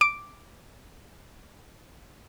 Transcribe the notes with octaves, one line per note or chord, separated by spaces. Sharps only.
D6 D7